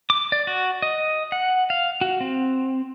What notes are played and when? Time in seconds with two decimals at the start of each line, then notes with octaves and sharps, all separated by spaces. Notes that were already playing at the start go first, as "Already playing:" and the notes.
0.10 D6
0.32 D5
0.47 F#4
0.82 D#5
1.32 F#5
1.70 F5
2.01 F#4
2.21 C4